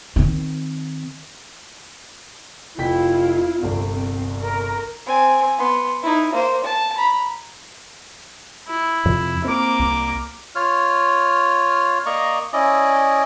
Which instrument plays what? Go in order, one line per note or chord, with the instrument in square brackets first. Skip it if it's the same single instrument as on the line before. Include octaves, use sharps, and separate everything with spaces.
[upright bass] D#3 C4
[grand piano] F1 G5 B6 [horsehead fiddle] E4 F4
[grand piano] G1 C2 [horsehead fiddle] C4
[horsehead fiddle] A#4
[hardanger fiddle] C4 G#5
B3 C6
D#4 E4
A#3 C5
A5
A#5 B5
[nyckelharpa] E4
[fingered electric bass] F2 C3 F3
[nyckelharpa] A#3 D6 [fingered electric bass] C4
[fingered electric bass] C2
[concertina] F4 C#5 F6
A#3 D5 D#5 A#5 C#6
C#4 E4 D5 D#5